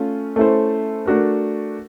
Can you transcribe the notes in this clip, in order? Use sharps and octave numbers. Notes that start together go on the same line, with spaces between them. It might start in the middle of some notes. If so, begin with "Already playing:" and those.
Already playing: A3 C#4 F4
A3 C#4 E4 A4 C5
A3 D4 F#4 A#4